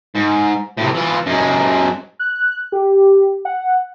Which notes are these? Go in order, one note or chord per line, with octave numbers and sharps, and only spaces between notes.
G#2
A2 C3
E3 F4
F#2 G#3
F#6
G4
F#5